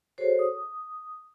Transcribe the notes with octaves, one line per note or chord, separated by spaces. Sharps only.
F#4 G#4 A4 C5 C#5
D#6